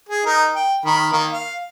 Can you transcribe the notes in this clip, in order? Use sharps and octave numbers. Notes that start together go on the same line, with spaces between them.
G#4
D#4 A#4
G5
D#3 A#4 B5
D#3 A#3
F5